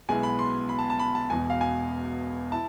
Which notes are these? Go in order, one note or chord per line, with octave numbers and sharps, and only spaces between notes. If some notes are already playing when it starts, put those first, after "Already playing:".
B1 B2 G#3 B3 E4 G#5
B5
C6
B5
A5
A5
B5
A5
E1 E2 B2 G#5
F5
G#5
E4 A5